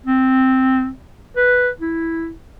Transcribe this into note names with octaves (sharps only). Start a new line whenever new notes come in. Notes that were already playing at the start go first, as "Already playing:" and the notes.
C4
B4
E4